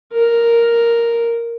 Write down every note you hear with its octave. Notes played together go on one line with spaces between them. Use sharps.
A#4